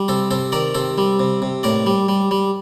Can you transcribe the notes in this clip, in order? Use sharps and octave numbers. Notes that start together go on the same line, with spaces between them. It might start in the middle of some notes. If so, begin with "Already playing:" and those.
Already playing: G3
C3 A4 C5
C3 A4 C5
D#3 A#4 D5
C3 A4 C5
G3
C3
C3
A2 A#4 D5
G3
G3
G3